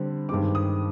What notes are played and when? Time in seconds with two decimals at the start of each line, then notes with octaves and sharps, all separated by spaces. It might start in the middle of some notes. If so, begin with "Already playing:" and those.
Already playing: D3 G3 C4
0.29 G2 D#3 G#3 C4 D6
0.55 D#6